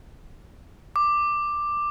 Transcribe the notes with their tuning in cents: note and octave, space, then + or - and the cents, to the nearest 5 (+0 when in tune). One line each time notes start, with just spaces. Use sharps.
D6 +10